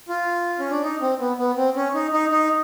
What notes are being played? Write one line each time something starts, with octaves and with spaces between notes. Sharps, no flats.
F4
C#4
D4
D#4
C4
B3
B3
C4
C#4
D#4
D#4
D#4